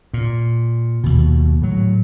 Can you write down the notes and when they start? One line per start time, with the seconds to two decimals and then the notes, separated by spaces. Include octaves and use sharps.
0.14 A#2
1.04 D#2 B2
1.62 A2 F#3